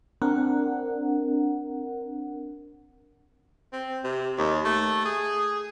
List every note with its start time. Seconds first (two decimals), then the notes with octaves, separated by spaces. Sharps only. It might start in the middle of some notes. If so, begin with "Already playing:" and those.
0.22 C4 D4 A#4 F#5
3.72 C4
4.04 C3
4.38 D#2
4.65 A3
5.05 G#4